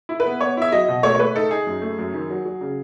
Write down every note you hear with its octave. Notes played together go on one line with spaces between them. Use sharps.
E4
B4
B3
B3 C#5
E4 E5
F#3 D#5
B2
A3 C#5
C#5
A3 B4
D#4 A4
D#4 G#4
F#2
A3
F#2
D#3
F#3
F#3
C#3